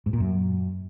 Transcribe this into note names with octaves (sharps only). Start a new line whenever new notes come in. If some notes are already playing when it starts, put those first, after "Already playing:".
G#2
A#2
F#2